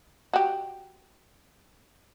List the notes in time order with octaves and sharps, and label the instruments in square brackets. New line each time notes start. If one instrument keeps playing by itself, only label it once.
[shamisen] F#4 G4